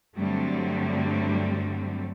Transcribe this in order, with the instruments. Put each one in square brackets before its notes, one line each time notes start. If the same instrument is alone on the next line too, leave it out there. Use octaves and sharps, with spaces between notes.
[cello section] G2 D3 F#3 G3 A3 C4